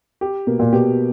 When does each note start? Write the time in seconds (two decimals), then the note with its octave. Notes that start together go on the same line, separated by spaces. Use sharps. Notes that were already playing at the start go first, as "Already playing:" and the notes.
0.21 G4
0.47 B2 A#3
0.60 A#2
0.73 B2 G4